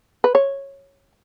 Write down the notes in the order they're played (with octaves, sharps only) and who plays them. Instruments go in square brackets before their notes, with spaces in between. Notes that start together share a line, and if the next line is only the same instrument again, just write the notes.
[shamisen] B4
C#5